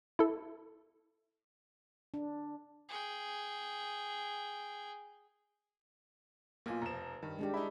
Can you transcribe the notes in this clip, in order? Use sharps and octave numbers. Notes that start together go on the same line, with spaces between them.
E4 A4
D4
G#4 G5
B1 A#3 F4 G#5
F1 F3 A#5 E7
G2 D#3
G#3 D4 G4
D#4 E4 B5